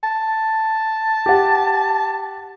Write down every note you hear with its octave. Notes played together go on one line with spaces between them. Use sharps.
A5
G4 F#5